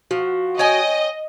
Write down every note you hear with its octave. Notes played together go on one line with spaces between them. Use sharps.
F3 F#4
C#5 D#5 G5 G#5